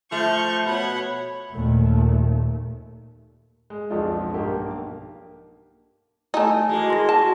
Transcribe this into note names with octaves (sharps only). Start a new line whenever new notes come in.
F3 A3 C#6 G6
B2 C#5 F#5 B5
D#2 A#2 A3
G#3
B1 F2 G#3 D4 F4 D#5
B1 G2 A#3 G4
A3 D#4 E4 G#5 A5
G#3 A#3 F#4
C6 A#6
F#4 A5